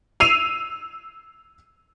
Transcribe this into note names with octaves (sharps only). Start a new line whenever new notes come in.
E6 C7 D#7 F7